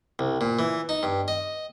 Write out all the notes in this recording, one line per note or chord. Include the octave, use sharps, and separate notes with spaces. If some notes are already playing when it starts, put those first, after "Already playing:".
C2
A#2
E3
D#4
G2
D#5